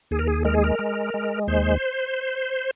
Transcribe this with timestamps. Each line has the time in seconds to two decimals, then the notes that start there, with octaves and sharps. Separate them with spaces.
0.11 D#2 G#4
0.19 A#4
0.27 G#4
0.45 G#3 A#4
0.54 G#4
0.64 A#4
0.79 G#3
1.14 G#3
1.48 D#2 C5